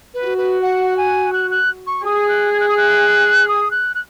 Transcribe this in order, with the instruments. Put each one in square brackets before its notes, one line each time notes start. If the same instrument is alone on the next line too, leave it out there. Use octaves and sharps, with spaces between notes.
[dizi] B4
[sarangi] F#4
[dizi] B4
F#5
G#5
F#6
F#6
C#6
[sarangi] G#4 [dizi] D#6
[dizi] F#6
G#6
F#6
D#6
F#6
D#6
F#6
F#6